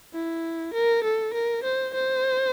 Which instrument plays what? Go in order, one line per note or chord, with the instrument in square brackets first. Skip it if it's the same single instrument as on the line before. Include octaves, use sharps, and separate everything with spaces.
[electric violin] E4
A#4
A4
A#4
C5
C5